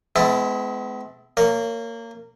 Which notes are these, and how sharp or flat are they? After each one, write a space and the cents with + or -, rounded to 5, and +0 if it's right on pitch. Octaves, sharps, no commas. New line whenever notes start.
G#3 +35 B3 +40 E4 +0
A#3 -20 C#5 +15